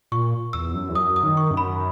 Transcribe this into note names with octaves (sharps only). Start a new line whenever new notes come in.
A#2 C#6
E2 E6
F#2
E2
F#2 D#6
D#6
D#3
C#6
F#2
B5